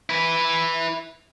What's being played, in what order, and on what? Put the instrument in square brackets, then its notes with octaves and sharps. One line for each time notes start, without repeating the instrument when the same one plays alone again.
[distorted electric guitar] E4 B4